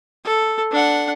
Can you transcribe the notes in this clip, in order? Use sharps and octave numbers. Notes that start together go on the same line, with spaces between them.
A4
D4 F#5